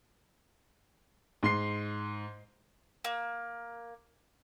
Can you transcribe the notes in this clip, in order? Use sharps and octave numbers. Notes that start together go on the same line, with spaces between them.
G#2 C6 C7
A#3